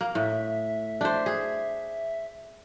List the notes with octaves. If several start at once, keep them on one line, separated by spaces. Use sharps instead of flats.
A#3
A2 E5
D4 C5
G#4